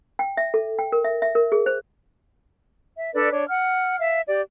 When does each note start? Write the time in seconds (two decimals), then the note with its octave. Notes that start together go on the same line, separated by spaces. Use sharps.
0.19 G5
0.37 E5
0.54 A4
0.79 G5
0.92 A#4
1.04 E5
1.22 E5
1.35 A#4
1.52 G#4
1.66 C5
2.97 E5
3.14 D4 A4 B4 D5
3.31 D4 C#5
3.49 F#5 F6
4.00 E5 F5
4.27 G4 D5